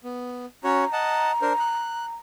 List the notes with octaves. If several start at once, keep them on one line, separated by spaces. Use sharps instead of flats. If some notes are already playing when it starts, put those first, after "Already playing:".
B3
C#4 F#4 C#5 A#5
D#5 F#5 A5
D4 A#4 C5
F#6